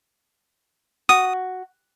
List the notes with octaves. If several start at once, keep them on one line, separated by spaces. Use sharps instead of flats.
F#4 D#6